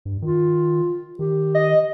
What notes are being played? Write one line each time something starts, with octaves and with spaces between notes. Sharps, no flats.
G2
D#3 F4
D#3 G4
D#5